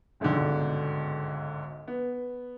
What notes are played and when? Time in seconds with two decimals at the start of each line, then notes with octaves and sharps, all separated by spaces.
0.20 G1 C#2 G#2 B2 D3
1.88 B3